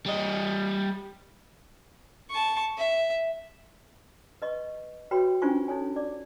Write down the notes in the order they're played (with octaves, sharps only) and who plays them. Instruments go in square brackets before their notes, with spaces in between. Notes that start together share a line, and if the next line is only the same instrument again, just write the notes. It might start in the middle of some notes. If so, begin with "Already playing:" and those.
[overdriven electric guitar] G3 D#5
[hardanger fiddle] A5 C#6
E5
[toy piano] B4 D#5 C#6
F#4 B4 C#5 G5 B5
C#4 D4 F4 C5 G#5 C#6
D#4 A4 C#5 G#5
D5 D6